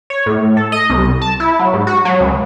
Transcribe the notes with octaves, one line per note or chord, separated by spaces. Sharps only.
C#5
A2
A4
D#5
C2
A5
E4
F#3
G#2
F#4
F#3
C#2